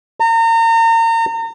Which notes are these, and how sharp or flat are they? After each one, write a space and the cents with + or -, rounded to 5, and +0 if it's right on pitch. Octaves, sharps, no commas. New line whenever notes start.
A#5 -35